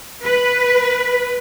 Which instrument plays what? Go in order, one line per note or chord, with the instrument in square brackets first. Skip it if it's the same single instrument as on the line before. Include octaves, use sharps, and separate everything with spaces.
[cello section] B4